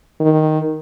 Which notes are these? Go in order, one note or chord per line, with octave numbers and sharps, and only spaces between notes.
D#3